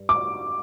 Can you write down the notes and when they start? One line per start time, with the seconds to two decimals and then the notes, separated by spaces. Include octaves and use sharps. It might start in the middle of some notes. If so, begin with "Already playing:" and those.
Already playing: G2
0.09 D6